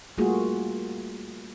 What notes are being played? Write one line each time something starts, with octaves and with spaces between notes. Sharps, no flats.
G3 A3 A#3 F4 F#4 G#4